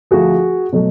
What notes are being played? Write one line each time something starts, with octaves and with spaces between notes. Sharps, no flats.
D2 D3 F3 A3 F#4 G#4
B2 F#3 A3